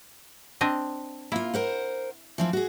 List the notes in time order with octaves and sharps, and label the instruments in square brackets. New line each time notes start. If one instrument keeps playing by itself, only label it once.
[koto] C4 D4 D#5
[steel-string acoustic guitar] A#3 F4 [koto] E4
[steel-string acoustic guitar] A#4 C5 F#5
E3 F3 C4
F#4 G#4